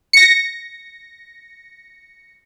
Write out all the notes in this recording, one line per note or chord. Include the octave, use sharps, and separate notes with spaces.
A#6 C#7